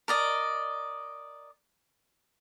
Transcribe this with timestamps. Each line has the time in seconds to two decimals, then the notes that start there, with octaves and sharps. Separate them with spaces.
0.08 A#4 D5 D#5